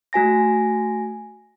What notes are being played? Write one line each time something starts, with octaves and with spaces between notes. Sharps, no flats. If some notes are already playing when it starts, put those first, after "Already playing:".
A3 F#4 G#5 A#6